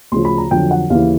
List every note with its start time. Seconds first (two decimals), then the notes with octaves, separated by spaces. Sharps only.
0.12 D2 C#3 F3 C6
0.25 B5
0.38 A#5
0.51 F2 D3 F#3 G5
0.71 F#5
0.90 D#2 C#3 E3 F5